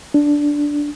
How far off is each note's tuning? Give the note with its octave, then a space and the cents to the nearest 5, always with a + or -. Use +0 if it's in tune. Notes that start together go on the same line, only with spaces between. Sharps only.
D4 -5